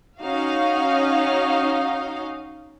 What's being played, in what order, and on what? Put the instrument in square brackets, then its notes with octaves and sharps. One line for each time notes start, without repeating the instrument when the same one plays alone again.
[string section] C#4 D#4 F#4 F5